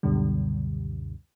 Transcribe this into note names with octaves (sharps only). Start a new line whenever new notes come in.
C#2 F#2 B2 D3 G3